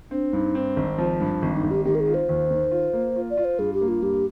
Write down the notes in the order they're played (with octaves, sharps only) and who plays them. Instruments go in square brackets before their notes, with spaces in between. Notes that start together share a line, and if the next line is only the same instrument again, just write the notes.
[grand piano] C4 [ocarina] D4
[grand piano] G2 [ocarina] D#4
[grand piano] C4
G#1
F3
G2
[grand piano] G#1 [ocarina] D4
[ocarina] D#4
[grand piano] G#1
[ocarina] G4
[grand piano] D#3 [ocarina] G4
[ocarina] A#4
G#4
[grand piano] F4
[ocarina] C5
[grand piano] D#2
D#3
F4
A#3
F4
[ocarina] D5
[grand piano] F4
[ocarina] C5
[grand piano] G2 [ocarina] G#4
[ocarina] G4
[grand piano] A#3
[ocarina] F4
[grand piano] G2 [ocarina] G4